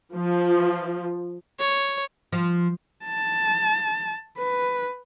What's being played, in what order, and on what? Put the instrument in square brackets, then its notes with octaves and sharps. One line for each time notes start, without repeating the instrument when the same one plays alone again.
[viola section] F3
[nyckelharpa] C#5
[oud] F3
[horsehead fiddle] A5
B4